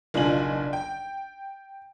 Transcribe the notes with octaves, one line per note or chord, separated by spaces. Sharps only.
F#1 B1 D4 F4 G#5 F#7
G5